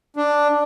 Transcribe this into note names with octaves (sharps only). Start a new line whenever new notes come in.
D4